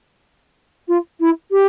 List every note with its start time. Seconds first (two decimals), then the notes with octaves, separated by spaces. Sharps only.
0.88 F4
1.20 E4
1.51 G4